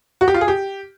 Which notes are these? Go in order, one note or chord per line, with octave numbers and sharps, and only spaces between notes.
F#4
G4
F4
G#4
G4